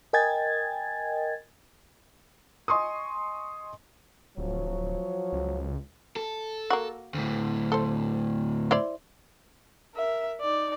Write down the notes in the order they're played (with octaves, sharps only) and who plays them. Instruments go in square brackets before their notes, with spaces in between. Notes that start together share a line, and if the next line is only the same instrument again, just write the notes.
[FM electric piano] A#4 D#5 G5 G#5 G#6 A6
[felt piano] D#5 G#5 C6 C#6 D#6
[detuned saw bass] D1 [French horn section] F3 F#3 C#5
[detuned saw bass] C#2
[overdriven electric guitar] A4
[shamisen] A#3 F#4
[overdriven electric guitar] D2 A2
[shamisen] A4 C5
E4 C5 D5
[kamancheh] A#4 E5
D#4 D5